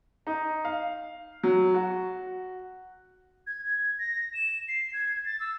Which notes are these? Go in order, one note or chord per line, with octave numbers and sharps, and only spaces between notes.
D#4
F5
F#3
F#4
G#6
G#6
A#6
E7
C7
G#6
A6
E6